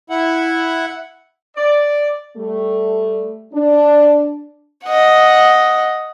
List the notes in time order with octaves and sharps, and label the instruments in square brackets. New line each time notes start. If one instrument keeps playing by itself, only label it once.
[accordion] E4 F#5
[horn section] D5
[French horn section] G3 A3
D4
[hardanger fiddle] D#5 F#5